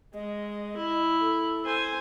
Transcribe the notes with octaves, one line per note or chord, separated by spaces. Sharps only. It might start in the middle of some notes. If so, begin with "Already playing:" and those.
G#3 D#5
E4
A4
C5 G#5